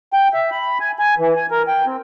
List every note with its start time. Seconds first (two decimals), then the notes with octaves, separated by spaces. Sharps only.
0.13 G5
0.34 E5
0.51 B5
0.80 G#5
0.99 G#5
1.18 E3
1.36 G#5
1.51 A#4
1.67 G5
1.86 C4